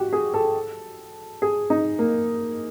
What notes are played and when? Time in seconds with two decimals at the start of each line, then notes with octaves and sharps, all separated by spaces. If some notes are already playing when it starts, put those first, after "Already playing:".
Already playing: F#4 G4
0.13 G#4
0.34 A4
1.42 G#4
1.70 D#4
1.99 A#3